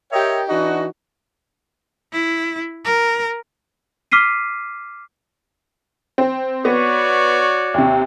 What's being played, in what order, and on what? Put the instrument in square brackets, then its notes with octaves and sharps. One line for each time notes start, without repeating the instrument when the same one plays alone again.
[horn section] G4 A#4 C#5 D#5 E5 G5
E3 D4 D#4 F#4
[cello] E4
A#4
[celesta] D6 F6 B6 C7 D#7
[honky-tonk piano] C4
[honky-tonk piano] B3 [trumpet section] F#4 C#5 D5
[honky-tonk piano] D#2 C3